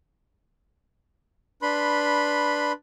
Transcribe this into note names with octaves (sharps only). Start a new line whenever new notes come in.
D4 B4 B5 C6